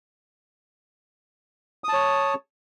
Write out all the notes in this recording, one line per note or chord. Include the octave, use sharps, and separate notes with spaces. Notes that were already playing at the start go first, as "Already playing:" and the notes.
C#5 A5 D#6